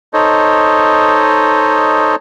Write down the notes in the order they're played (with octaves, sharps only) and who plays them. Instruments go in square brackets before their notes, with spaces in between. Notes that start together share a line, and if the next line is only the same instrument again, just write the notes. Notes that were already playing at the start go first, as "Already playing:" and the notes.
[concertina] D#4 A4 C5 C#5 D#5